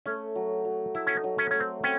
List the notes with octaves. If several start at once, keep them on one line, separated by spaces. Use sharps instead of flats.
A3 C#4
F#3
F#3
A3 E4
C#4
D#4
F#3
C#4
A3 C#4
C4
C4 C#4